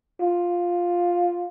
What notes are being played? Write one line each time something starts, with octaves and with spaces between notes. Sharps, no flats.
F4